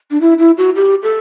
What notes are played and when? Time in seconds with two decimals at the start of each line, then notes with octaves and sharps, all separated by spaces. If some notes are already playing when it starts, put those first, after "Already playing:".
0.11 D4
0.21 E4
0.39 E4
0.58 F#4
0.76 G4
1.03 A4